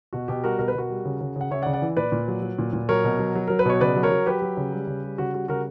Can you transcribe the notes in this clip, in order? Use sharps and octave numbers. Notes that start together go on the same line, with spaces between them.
B2 F#4
B2 G4
G3 F#4 A#4
B2 A#4
B4
B2 F#4 A#4
G3
C#3
C#3
C#3 F#5
C#3 C#5 E5
D5 F#5
C#3
D5 F#5
E3
A#2 B4 D5
A#2
F#3
F#3
A#2
A#2
F#3 A#4 C#5
B2
F#3
F#3
F#3 A#4
B4
B2 C#5
C#3 B4 D5
F#3
A#4 C#5
F#3
F#3 G4 B4
F#3
C#3
G3
C#3
G3
C#3 F#4
G3 F#4
C#3 F#4 A#4